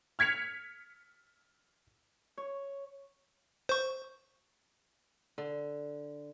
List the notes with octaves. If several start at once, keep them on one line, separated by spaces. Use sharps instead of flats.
F6 G#6 B6 C#7 F7
C#5
C5 C#6
D3